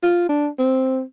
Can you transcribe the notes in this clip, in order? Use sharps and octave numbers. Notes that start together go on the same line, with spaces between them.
F4
D4
C4